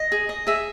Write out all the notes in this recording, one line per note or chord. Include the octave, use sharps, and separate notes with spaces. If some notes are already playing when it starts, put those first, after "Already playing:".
Already playing: D#5
G#4
D#5
G#4 E5